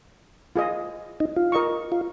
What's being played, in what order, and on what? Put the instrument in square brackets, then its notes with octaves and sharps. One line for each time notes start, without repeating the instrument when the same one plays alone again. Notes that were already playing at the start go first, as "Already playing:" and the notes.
[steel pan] F4 G#4 D#5
[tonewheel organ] D#4
F4
[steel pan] A#4 D#5 C#6
[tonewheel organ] F4